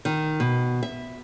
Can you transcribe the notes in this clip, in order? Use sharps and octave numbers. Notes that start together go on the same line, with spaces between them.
D#3
B2
E5